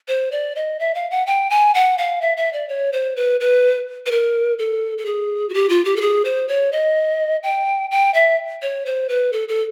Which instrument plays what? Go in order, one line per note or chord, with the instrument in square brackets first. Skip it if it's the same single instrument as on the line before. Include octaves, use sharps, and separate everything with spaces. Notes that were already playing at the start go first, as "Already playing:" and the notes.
[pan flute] C5
D5
D#5
E5
F5
F#5
G5
G#5
F#5
F5
E5
E5
D5
C#5
C5
B4
B4
B4
A#4
A4
A4
G#4
F#4
G4
F4
G4
A4
G#4
C5
C#5
D#5
G5
G5
E5
C#5
C5
B4
A4
A4